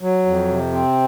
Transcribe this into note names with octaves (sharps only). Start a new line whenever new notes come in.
F#3
F2
C3
C4